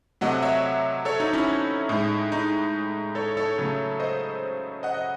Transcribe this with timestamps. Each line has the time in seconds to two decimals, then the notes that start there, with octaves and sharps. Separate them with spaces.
0.21 C3 F#3 A3 D#5 F#5
0.43 C#5 E5
1.05 A4 C#5
1.20 D#4 F#4
1.33 C#4 E4
1.89 A2 G#3 D#4
2.32 D#4
3.15 A4 C#5
3.37 A4 C#5
3.58 C#3 F#3 A3
4.00 C5 D#5
4.83 D#5 F#5
4.94 D#5